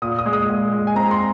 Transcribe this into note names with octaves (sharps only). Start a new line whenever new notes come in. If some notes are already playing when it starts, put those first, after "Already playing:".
A#2 D#6
D#6
G#3
D#6
A#2
G#3
G#5
C4 A#5
C6